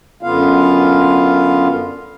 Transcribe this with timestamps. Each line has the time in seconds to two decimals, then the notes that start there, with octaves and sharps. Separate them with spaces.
0.23 F#2 D3 B3 F4 F5